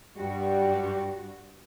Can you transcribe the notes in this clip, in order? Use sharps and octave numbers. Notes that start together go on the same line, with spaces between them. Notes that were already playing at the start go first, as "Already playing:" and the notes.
G2 G3 F#4